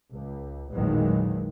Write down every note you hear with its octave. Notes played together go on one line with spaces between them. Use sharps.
C#2
A1 E2 A#2 D#3 F#3 G#3